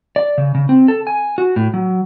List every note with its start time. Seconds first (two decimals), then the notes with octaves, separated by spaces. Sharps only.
0.16 D5
0.38 C#3
0.55 C#3
0.69 C4
0.88 A4
1.07 G#5
1.38 F#4
1.56 A2
1.74 F#3